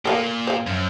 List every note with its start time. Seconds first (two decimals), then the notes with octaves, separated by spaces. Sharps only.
0.05 A#2 A4 A#4 F5
0.47 C5 F5
0.67 F#2